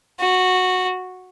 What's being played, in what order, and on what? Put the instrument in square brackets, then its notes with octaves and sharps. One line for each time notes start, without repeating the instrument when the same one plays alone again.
[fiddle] F#4